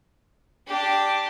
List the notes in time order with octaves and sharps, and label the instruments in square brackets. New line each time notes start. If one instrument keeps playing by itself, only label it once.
[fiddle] D4 G4